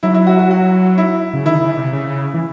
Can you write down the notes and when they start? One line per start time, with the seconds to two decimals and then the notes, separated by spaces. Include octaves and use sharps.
0.03 F#3 E4
0.14 E4
0.27 F#4
0.39 F#4
0.51 F#4
0.98 E4
1.34 C#3
1.45 D#3 E4
1.61 C#3
1.77 C3
1.93 C#3
2.34 E3